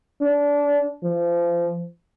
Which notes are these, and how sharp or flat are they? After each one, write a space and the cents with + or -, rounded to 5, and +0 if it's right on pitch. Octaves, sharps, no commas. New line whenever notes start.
D4 -25
F3 -25